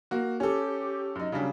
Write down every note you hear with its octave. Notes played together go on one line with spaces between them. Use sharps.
A#3 F#4
C#4 G4 A4
F#2 D#4
C#3 F#3 G3 C#4 D4